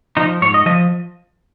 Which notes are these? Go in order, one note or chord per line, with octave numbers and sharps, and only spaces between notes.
F3 D#4
G#2 C#5
D#5
F3 D#5